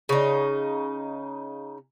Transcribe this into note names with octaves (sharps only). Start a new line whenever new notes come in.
C#3 D#4